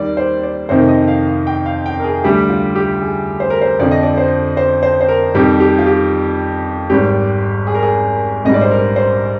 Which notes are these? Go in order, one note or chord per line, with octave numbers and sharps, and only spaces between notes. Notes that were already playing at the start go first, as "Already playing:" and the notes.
Already playing: D#2 D#3 G3 D5
C5
D5
F2 C3 D#3 C5
D#5
F5
F5
G5
F5
G5
A#4
G#4
D2 D3 G3 G4
F4
G4
G#4
C5
A#4
C5
F2 D3 F3 D5
D#5
D5
C5
C5
C5
C5
A#4
F2 D#3 G3 G4
G4
F4
G4
G#1 G#2 G3 G4
G#4
A#4
G#4
A#1 G#2 G3 D#5
D5
C5
A#4
C5